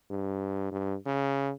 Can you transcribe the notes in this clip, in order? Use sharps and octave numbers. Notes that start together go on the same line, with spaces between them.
G2
G2
C#3